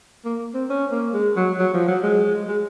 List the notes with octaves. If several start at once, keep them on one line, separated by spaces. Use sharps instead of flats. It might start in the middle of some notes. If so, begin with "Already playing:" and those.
A#3
C4
C#4
A#3
G#3
F#3
F#3
F3
F#3
G#3
G#3